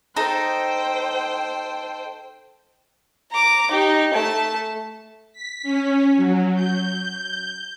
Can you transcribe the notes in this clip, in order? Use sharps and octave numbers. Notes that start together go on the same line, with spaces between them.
D#4 A4 C5 G5
A#5 D6
D#4 G4
A3 A5
B6
C#4
F#3
G6